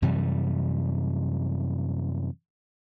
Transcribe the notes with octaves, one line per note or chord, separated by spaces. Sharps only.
F#2 C3 E3 G3